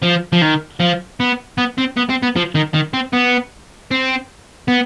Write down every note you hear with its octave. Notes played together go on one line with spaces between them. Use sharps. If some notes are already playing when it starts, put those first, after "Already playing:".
F3
F3
D#3
F3
B3
B3
C4
B3
C4
B3
F3
D#3
D#3
C4
B3
C4
B3